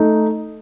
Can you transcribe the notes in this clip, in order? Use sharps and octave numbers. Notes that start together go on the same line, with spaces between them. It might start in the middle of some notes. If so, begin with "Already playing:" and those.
Already playing: A3 D#4